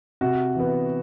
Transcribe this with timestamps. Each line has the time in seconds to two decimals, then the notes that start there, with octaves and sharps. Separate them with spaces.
0.21 C3 F#4
0.55 E3 B3